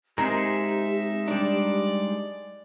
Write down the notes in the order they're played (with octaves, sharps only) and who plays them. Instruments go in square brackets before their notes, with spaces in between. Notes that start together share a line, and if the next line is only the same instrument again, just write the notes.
[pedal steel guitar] G#3 D#4 G#4 [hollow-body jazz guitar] C4 A#4 [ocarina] G4 [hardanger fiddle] E5
[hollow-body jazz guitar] G3 D4 [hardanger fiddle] D5